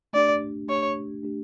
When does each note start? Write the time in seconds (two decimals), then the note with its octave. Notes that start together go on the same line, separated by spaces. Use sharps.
0.13 A3 D4 G4 D5
0.68 A3 D4 G4 C#5
1.23 A3 D4 G4